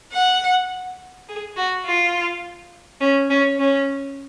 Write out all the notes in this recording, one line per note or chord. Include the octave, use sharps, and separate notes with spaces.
F#5
G#4
F#4
F4
C#4
C#4
C#4